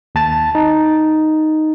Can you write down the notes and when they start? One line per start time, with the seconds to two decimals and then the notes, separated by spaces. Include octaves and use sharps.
0.15 D#2 A5 A6
0.55 D#4